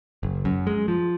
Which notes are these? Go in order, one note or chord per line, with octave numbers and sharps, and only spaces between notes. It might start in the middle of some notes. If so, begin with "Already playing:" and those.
F#1
F#2
G#3
F3